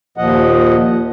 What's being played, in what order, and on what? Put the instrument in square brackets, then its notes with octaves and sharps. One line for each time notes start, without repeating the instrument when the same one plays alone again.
[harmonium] D#2 A#2 F3 D#5 F#5